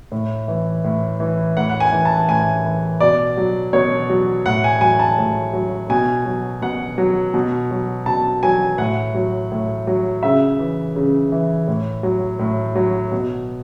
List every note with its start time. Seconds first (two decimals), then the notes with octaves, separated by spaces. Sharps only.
0.12 A2
0.48 E3
0.84 A2
1.20 E3
1.57 A2 F#5
1.69 F#5
1.80 G#5
1.92 E3
2.05 A5
2.28 A2 G#5
2.65 E3
3.00 B2 D5
3.37 F#3
3.73 B2 C#5
4.10 F#3
4.46 A2 F#5
4.64 G#5
4.81 F#3 G#5
4.99 A5
5.18 A2
5.53 F#3
5.90 B2 G#5
6.25 F#3
6.62 B2 F#5
6.98 F#3
7.34 B2
7.71 F#3
8.06 B2 A5
8.43 F#3 G#5
8.78 A2 F#5
9.14 F#3
9.52 A2
9.87 F#3
10.23 C#3 E5
10.59 E3
10.96 C#3
11.32 E3
11.68 A2
12.03 F#3
12.39 A2
12.75 F#3
13.12 B2